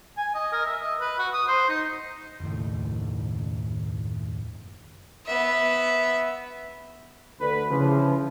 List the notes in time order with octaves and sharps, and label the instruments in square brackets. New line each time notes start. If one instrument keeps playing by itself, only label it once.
[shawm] G#5
D#5
A#4
E5
D#5
B4
F#4
D#6
C5
D#4
[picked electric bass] F#1 D#2 A2
[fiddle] B3 E5
[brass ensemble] D2 B4
C#3 E3 F3